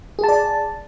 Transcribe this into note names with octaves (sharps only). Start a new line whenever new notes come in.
G#4 D5 A5